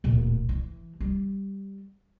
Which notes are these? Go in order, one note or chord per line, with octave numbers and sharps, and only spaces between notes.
D1 A#2
E3
G3